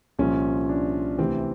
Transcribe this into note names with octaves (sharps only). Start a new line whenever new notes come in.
C2 A#2 F3 C#4
D4
D2 C3 E3 C4